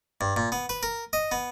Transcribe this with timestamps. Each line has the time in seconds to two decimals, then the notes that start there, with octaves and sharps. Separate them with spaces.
0.21 G2
0.36 A#2
0.52 B3
0.69 B4
0.83 A#4
1.13 D#5
1.32 B3